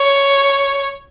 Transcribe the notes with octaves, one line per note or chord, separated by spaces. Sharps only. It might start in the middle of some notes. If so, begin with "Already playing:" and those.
Already playing: C#5